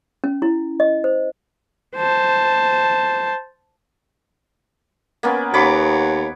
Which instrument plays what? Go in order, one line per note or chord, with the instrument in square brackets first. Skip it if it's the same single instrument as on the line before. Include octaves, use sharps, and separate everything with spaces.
[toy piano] C#4
E4
D#5
C5
[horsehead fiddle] C5 A5
[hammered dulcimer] A#3 B3 C#4
[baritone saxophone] D#2 [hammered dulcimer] C#5 B5 D6